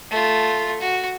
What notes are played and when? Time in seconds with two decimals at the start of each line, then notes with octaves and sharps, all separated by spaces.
0.10 A3 F4
0.80 F#4